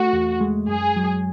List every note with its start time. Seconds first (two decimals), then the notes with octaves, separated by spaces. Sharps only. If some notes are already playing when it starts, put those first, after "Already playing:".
Already playing: A3 F#4
0.13 E2
0.41 G#3
0.68 F#2 G#4
0.96 F#3